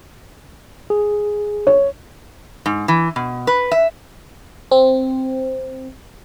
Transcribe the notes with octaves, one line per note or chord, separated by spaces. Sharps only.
G#4
C#5
G#2
E3
B2
B4
E5
C4